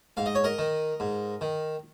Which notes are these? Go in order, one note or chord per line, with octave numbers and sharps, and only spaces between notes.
G#2 F5
D#5
C#5
A#4 D#5
D#3
G#2
D#3